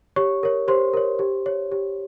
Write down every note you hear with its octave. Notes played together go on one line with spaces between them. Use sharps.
G4 C#5 C#6
A#4 C#5
G4 C5 C6
A#4 C#5
G4
C#5
G4